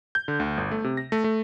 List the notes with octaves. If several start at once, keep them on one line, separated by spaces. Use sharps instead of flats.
G6
D3
D2
G1
A3
C3
A#6
A3
A3